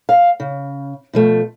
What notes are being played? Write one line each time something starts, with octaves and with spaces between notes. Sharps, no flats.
F5
C#3
B2 F3 A3